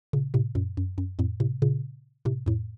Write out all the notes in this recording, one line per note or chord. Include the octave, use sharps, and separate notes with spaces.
A#2 C#3
A2 C3
F#2 A#2
F#2
F#2
F2 A2
A2 C3
A#2 C#3
A2 C3
F2 A2